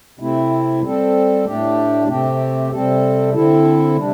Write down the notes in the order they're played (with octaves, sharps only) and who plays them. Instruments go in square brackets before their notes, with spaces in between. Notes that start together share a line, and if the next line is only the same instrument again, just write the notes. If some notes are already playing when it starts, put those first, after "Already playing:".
[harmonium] C3 A3 C4 E4
G3 C4 A4
A2 A3 D4 G4
C3 A3 C4 G4
C3 G3 C4 A4
D3 C4 E4 A4
C3 G3 D4